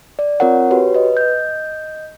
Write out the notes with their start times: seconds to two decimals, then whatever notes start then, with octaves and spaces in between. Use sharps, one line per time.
0.19 D5
0.40 C4 F4 A#4 C#5 F#5
0.71 F#4 G4 B4 C#5
0.95 B4 D#5
1.17 D#5 G6